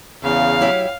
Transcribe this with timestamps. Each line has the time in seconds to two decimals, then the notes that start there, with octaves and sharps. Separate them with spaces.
0.23 E2 C#3 F5
0.61 F#3 E4 G4